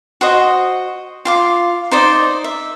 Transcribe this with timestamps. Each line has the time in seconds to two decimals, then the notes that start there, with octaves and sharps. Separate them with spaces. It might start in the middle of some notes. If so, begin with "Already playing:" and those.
0.21 F#4 C5 D#5
1.25 F4 F5 D6
1.91 D#4 C5 D5 D#5
2.44 E5